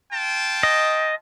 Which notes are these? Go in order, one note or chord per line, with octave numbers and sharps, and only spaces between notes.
F4 G5 A5
D#5